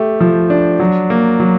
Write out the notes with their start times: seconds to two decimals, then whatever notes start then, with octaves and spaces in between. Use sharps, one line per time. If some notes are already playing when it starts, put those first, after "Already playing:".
Already playing: A3 G4
0.21 F3
0.50 D4
0.79 F#3
1.10 A#3
1.40 F#3